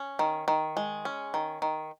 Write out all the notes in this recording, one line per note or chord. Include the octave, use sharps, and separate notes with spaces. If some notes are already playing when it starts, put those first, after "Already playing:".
Already playing: C#4
D#3
D#3
G#3
C#4
D#3
D#3